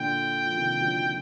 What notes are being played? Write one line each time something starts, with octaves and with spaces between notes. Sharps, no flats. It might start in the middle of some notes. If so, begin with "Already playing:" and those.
Already playing: A#2 D3 G5
F3
C3 D#3
D3 F3
F3